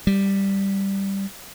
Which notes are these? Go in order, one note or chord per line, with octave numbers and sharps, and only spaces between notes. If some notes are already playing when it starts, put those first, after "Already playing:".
G3